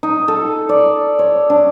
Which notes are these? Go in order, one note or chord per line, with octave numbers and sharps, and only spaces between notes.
D#4
A4
D5
C#5
D4